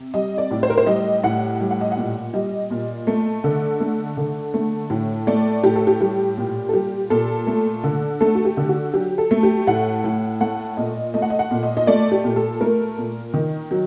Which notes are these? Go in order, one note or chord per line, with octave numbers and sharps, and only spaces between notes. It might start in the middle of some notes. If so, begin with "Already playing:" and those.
Already playing: C3
G3 D#5
D5
A2
C5
A#4
C5
G3 D#5
A2 F#5
G3
F#5
D#5
F#5
A#2
G3 D#5
A#2
A3
D3
A3
D3
A3
A2
A3 D5
A2 G4
A4
G4
G3 G4
A#2
A4
G3 G4
A#2 A4
A3
D3
A3 A4
F#4
G4
D3
F#4
F#3 G4
A4
A3
G4
A2 F#5
A2
A3 F#5
A#2 D#5
A3 D#5
F#5
D#5
F#5
A#2
D#5
D#5
A3 D5
G4
A#2
A4
A3 A#4
A#2
D#3
F#3